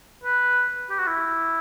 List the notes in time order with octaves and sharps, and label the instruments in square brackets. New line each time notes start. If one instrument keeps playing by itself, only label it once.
[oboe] B4
G4
F#4
E4